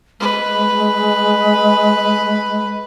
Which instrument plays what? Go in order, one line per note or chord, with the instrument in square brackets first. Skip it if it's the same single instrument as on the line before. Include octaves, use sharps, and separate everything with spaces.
[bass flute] G#3 [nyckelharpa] B4